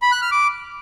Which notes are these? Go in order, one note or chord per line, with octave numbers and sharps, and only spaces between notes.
B5
F#6
F6
D6